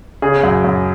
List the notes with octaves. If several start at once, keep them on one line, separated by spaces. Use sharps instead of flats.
C#3 G#4
F#2
F#2